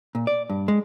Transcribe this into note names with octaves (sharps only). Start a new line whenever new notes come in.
A#2
D5
G2
G#3